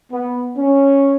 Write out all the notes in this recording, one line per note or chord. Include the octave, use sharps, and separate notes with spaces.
B3
C#4